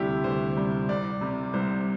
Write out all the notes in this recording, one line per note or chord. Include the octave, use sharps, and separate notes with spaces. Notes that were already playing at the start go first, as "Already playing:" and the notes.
Already playing: D2 C3 G3 E4 G4
D2 C5
C3 G3
C2 D5
C3 G3
C2 C5